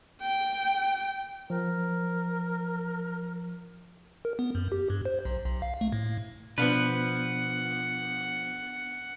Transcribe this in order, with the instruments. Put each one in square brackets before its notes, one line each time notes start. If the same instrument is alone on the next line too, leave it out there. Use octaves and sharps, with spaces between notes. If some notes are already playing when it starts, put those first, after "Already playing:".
[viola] G5
[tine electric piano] F3 [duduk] A#4
[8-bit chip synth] A#4
B3
F#2
G4
G2
C5
B1
B1
F5
A3
A2
[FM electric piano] B2 [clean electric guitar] F3 B4 [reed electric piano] B3 D4 [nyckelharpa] F#5